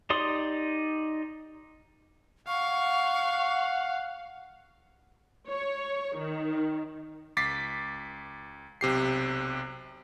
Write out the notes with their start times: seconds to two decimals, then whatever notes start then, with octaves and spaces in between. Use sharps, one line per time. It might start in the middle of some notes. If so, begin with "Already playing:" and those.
0.10 D#4 G4 D5 C6 D#6
2.48 F5 F#5 C#6
5.49 C#5
6.18 D#3
7.37 C#2 D6 A6 B6 C7
8.81 B1 C3 G4 C7